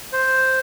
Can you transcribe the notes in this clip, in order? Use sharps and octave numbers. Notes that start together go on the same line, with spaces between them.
C5